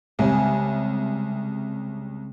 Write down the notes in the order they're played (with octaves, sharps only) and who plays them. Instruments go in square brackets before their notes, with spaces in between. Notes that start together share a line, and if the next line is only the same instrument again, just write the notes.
[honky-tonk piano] C2 [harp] C#3 G#3